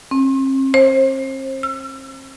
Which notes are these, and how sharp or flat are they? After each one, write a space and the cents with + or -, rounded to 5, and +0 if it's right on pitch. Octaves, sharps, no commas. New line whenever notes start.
C4 +40
C5 +30
E6 +45